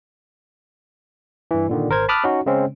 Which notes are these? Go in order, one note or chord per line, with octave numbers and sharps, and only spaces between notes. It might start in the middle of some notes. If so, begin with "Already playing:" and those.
G2 E3
A#2 D3 D#3
G#1 A#4 C5 G#6
A5 B5 D6 D#6 F6 F#6
C#4 D#4 F#4
C#3 G#3 C4 C#4